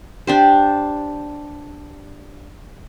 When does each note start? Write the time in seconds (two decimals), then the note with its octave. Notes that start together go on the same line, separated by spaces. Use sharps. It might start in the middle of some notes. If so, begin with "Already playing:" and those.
0.27 D4 G4 C5